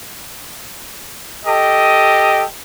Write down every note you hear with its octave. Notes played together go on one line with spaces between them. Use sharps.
G4 A4 D#5